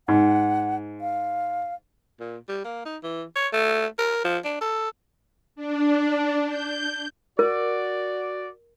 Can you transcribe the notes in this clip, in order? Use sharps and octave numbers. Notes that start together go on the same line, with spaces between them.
G#2 F#5
F5
A#2
G3
A#3
D#4
E3
C#5
A3
A#4
F3
D4
A4
D4
G6
F#4 A#4 D5